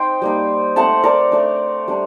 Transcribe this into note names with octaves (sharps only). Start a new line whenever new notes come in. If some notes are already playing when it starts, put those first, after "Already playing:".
Already playing: C4 D#4 C5 D#5 G5
G3 A#3 D#4
A3 C4 D#4 F#5 A5
A#4 D5
A3 D4
G3 D4